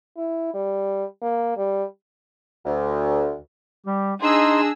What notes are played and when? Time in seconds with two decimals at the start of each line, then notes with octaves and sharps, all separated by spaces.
0.17 E4
0.54 G3
1.22 A#3
1.57 G3
2.65 D2
3.86 G3 G4
4.22 D4 D#4 G#4 D#5 C6 E6